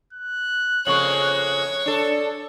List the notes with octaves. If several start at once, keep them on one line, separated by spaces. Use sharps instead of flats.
F#6
F2 C#3 A#3 C#5 C#6 F#7
D4 A4